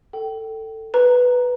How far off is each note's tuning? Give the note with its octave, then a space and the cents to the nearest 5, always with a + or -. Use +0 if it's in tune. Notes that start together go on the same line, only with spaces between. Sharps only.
A4 +15 G5 -25
B4 +0 A#5 +0